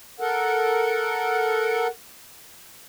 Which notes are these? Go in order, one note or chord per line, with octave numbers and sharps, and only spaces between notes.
A4 A#4 F#5